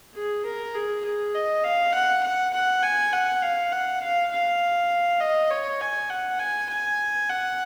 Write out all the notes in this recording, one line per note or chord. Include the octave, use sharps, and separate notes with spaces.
G#4
A#4
G#4
G#4
D#5
F5
F#5
F#5
F#5
G#5
F#5
F5
F#5
F5
F5
D#5
C#5
G#5
F#5
G#5
G#5
F#5